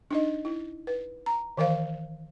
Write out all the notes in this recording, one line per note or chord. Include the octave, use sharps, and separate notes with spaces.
D4 D#4 D#5
E4
B4
A#5
D#3 E3 A#4 C5 F5